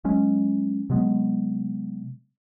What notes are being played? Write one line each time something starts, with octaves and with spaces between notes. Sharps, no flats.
F#3 G#3 C#4
C3 F#3 G#3 B3